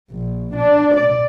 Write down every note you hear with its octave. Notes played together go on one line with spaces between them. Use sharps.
A#1
D4
D5